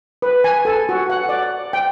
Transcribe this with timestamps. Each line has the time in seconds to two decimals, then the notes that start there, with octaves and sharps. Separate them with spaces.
0.22 B4
0.44 G#5
0.65 A4
0.89 F#4
1.10 F#5
1.29 D5
1.73 G5